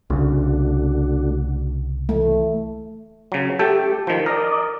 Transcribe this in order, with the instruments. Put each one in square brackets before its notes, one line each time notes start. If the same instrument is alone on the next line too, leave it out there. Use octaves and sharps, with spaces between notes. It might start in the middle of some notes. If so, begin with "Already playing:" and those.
[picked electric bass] C2 C#3 [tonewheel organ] A3 D4 F#4
[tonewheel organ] E3 [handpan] A3
[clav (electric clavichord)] C#3 F#3
[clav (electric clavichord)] A3 A4 G5 [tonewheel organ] G4
[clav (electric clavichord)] D#3 F3 [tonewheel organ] G5
[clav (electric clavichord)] A#4 [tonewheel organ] D5 D#5